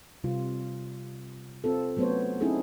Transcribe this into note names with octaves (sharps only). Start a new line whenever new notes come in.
C3 G3 F4
C4 F4 A4
F#3 A3 B3 C#4 C5 C#5
C4 C#4 D#4 E4 G#4 A4